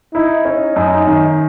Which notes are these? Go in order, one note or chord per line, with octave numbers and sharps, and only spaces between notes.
D#4 E4
C#4
F#2
D#3